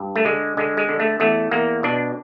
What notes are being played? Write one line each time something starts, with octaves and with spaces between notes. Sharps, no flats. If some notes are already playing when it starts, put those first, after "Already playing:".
Already playing: G2
A3
D3 G#3
D3 G#3
G#3
D3
A3
E2 A3
E2 A#3
B2 D4